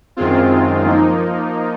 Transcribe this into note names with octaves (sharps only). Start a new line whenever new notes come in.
F#2 D#3 G#3 C4 F4
F3 A#3 D#4